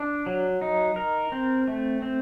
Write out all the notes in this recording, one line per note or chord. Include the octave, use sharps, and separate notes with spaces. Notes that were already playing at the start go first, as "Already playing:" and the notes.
Already playing: D4
F#3
D#4
A#4
C4
A3
C4